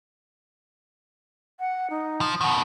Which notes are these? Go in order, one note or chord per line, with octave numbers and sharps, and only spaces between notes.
F#5
D#4
F3
B2 D#3 F#5